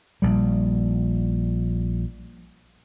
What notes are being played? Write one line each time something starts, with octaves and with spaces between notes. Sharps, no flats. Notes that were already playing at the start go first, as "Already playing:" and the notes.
A#1 G3